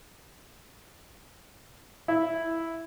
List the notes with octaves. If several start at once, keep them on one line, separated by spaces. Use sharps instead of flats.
E4